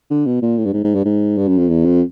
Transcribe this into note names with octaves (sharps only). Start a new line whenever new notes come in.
D3
B2
A#2
A2
G2
G#2
G#2
G2
G#2
G2
F#2
F2
E2
F2